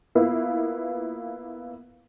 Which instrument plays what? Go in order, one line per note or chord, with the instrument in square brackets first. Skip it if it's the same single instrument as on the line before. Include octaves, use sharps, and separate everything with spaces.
[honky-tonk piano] A#3 B3 E4 F4